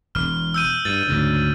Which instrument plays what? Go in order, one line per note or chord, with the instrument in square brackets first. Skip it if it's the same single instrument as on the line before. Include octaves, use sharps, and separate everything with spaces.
[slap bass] E1 [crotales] F6
[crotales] E6 G6 D#7
[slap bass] G2 [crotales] A6
[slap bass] D2 G#2 C#3